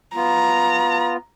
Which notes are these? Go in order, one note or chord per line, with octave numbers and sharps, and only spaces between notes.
B3 F4 A#5